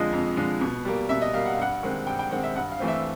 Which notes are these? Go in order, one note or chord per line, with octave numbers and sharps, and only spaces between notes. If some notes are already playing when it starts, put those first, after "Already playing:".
Already playing: F2 D3 F3 G#3 D#5
F2
D3 F3 G#3
B2
G3 A#3
B2 E5
D#5
G3 A#3 F5
F#5
F5
G2 F#5
D#3 G#3 C4
G2 G5
G5
D#3 G#3 C4 F#5
E5
G2 F#5
F5
E3 A3 C4
E5